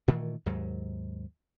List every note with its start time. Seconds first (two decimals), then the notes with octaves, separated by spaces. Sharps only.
0.08 A#2 D#3 E3 A3
0.46 D#2 G#2 F#3